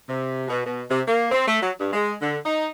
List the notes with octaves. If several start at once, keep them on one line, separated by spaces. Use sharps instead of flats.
C3
B2
B2
C3
A#3
C4
A3
F#3
G2
G#3
D3
D#4